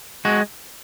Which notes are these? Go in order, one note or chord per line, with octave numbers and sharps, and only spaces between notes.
G#3 F#4